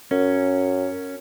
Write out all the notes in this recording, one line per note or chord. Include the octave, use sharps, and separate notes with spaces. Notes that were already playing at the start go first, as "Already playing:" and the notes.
F#2 C#4